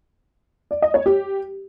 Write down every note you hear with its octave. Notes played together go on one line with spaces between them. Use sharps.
D5
D#5
C#5
G4